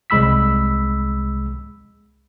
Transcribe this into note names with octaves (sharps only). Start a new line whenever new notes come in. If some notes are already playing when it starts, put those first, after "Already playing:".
C2 G#3 B5 E6 B6